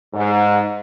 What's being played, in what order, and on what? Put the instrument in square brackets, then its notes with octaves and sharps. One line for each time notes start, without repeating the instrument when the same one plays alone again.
[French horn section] G#2